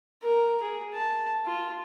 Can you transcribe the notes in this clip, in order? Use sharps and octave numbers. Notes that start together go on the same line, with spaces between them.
A#4
G#4
A5
F4